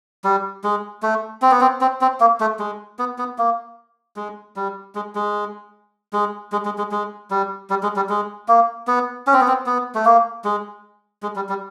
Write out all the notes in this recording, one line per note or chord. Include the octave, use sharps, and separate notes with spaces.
G3
G#3
A3
C4
B3
C4
C4
C4
A#3
A3
G#3
B3
B3
A#3
G#3
G3
G#3
G#3
G#3
G#3
G#3
G#3
G#3
G3
G3
G#3
G3
G#3
A#3
B3
C#4
C4
B3
C4
B3
A3
A#3
G#3
G#3
G3
G3